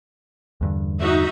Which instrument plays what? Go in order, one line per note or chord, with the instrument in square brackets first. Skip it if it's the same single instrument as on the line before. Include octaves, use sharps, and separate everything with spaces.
[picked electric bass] E2 G2 D3
[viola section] D#4 F#4 E5